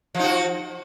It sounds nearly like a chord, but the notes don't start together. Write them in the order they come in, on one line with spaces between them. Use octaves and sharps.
F3 D#4 F#4